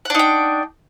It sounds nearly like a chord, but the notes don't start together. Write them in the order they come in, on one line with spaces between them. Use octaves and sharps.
F#5 D4 D#4 G5